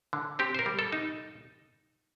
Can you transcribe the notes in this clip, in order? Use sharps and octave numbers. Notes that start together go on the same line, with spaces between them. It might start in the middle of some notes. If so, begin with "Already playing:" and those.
D3
C4 G4
C5
A#4
G3
A4
D#4